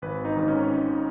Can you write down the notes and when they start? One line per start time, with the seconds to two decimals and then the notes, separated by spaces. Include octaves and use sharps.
0.02 G#1 B4
0.25 D#4
0.37 G#2 D#3
0.48 C#4